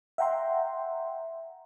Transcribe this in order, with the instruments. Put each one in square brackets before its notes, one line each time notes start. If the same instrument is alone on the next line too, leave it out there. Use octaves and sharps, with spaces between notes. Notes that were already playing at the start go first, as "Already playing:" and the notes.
[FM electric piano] E5 F#5 G5 A#5 C6